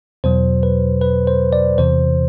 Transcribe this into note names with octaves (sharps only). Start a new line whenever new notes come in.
E2 B2 F#3 C5
B4
B4
C5
D5
E2 C3 E3 C5